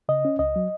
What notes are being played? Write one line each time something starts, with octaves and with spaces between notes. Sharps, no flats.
C#3 D#5
C#4
C#2 D#5
F#3